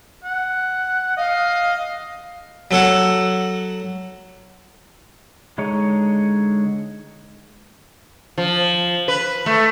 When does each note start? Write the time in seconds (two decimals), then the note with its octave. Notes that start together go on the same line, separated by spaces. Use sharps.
0.24 F#5
1.17 D#5 F5
2.71 F#3 A4 F#5
5.58 D3 G#3 D#4 C#5
8.38 F3
9.08 B4
9.46 A3